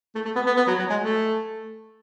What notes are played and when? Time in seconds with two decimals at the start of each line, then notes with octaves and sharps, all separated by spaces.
0.15 A3
0.25 A3
0.35 B3
0.46 B3
0.57 B3
0.67 F#3
0.79 F#3
0.90 G#3
1.00 A3